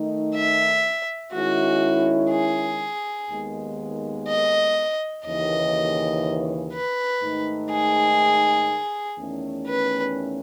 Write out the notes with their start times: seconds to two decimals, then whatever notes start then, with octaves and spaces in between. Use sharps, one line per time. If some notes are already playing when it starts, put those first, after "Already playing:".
Already playing: D#3 A3 D#4
0.35 E5
1.33 D#3 G#3 C#4 E4 F#4
2.31 G#4
3.30 D#2 D#3 G#3 B3
4.28 D#5
5.26 D#2 C#3 E3 D#5
6.73 B4
7.22 G#2 D#3 A3 D#4
7.71 G#4
9.18 E2 D#3 A3 C#4
9.67 B4